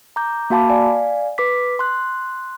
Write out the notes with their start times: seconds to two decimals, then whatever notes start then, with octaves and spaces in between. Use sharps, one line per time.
0.16 A#5 D6 G6
0.50 A#3 F#4 F5 A5 B5 D6
0.68 D5 F5 G#5
1.38 B4 D6 B6
1.79 C6 F#6